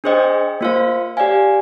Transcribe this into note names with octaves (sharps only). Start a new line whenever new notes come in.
D4 G#4 C5 D#5 G5
A#3 F4 C5 F5
G4 D5 F5 G#5